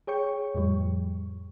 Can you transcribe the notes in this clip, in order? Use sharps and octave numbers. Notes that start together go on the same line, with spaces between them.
G#4 C#5 G5 C#6
F2 A2 F3 G3